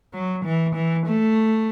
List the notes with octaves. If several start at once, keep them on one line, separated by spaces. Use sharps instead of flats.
F#3
E3
E3
A3